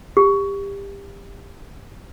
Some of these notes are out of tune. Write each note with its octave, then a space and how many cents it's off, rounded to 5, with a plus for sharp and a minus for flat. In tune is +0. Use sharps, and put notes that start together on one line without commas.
G4 +25